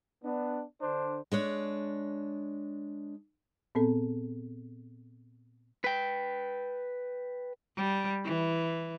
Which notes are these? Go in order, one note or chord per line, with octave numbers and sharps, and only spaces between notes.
B3 D4
D3 D4 C5
G#3 D4 C#5
A#2 B3 C4 A4
B4 G5
G3
E3